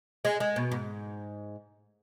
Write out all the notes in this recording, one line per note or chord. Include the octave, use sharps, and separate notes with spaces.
G#3
G#3
B2
G#2